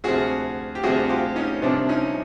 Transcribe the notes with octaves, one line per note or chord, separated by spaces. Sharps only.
D2 C3 F3 F#4 G#4
G4
D2 C3 F3 F#4 G#4
F4 G4
C#4 D#4
C2 C3 F3 C4 D4
C#4 D#4